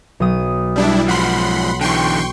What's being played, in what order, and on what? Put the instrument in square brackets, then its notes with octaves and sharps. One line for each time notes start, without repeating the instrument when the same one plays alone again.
[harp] B1 D#6
[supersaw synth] G3 D4 E4
[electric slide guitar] G#2 F3 [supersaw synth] F#5 B5 C6
[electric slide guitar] D3 E3 [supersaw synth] G5 C6 C#6